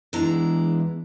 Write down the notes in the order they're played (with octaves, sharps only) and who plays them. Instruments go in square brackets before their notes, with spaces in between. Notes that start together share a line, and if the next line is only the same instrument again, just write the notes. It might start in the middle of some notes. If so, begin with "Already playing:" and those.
[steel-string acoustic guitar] E2 G#3 D4 E4 A#5